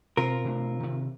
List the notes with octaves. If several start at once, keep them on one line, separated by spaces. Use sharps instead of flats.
B2 C4 F4 A#4
B2 A3 D4
C3 D#3